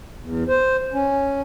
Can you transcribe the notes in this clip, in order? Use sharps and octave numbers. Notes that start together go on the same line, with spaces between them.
E2
C5
C#4